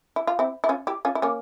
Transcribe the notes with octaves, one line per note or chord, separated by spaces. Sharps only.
E4
F4
C4 E4
E4
C#4 F4
E4 G4
C#4 F4
E4
A#3 C#4